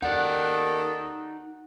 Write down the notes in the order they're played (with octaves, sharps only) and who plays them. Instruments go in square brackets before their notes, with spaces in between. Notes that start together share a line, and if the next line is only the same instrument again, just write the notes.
[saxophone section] D#2 D#3 A4 [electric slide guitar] D#4 D5 [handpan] F#5